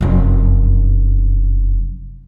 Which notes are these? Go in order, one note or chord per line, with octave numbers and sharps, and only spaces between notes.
F1 F#2